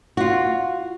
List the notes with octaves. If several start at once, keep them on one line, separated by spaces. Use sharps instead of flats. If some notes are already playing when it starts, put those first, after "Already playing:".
F4 F#4